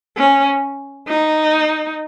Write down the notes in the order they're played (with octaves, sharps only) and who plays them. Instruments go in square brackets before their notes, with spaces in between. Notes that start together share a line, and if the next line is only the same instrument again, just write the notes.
[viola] C#4
D#4